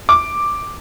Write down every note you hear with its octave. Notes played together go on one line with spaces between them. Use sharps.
D6